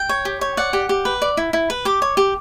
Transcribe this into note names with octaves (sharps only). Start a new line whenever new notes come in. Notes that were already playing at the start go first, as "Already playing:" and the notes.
Already playing: G5
C#5
G4
C#5
D5 F#5
G4
G4
B4
D5
E4
E4
B4
G4 D6
C#5
G4